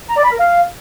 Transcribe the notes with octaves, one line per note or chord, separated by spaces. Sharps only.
A#5
D5
B5
A#4
F5